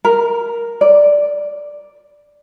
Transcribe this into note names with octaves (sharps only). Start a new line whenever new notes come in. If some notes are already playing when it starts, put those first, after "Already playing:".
A#4
D5